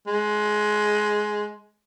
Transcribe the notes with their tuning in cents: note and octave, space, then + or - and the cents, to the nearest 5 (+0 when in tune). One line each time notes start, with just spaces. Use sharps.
G#3 +15